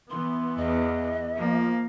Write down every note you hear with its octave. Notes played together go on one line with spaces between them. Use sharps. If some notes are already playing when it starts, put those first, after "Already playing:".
E3 B3 C6
E2 D#5
F3 A#3